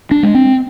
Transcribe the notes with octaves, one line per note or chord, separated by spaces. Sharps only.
D4
G#3
C4